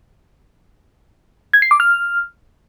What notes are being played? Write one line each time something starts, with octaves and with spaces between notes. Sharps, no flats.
G#6
C7
D6
F6